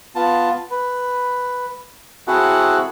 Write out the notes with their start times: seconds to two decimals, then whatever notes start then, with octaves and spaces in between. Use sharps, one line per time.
0.15 B3 F4 A5
0.71 B4
2.27 C4 E4 F#4 G#4 A4 F#5